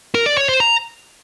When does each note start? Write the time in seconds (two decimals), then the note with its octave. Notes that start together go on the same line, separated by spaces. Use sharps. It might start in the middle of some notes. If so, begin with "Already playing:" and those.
0.15 A#4
0.26 D5
0.37 C#5
0.49 C5
0.60 A#5